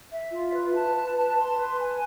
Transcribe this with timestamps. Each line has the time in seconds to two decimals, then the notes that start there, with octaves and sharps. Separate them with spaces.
0.11 E5
0.32 F4
0.53 B4
0.74 A5
0.95 B4
1.16 A5
1.37 C6
1.58 B4
1.79 G#5